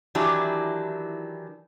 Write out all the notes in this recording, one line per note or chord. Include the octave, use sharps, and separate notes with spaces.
D#3 E3 F#3 D4 E4 G4